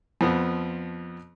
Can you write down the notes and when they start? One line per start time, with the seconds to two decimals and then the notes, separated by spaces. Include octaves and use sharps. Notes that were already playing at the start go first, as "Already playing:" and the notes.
0.21 F2 F3 B3